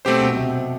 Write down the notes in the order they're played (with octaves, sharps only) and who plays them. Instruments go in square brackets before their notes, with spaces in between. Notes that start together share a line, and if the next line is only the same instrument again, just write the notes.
[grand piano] B2 [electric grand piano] A3 C4 G4 C5
[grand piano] B2
B2
C3